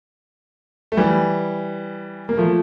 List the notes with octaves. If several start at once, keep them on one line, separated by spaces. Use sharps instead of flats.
A3
E3 G3
A#3
F3 A3